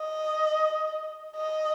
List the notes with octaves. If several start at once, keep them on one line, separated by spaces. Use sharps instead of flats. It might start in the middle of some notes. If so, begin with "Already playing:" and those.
Already playing: D#5
D#5